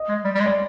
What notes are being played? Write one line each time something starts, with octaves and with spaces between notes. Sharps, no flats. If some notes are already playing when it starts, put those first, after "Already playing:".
Already playing: D#5
G#3
G3
G3
G#3
D5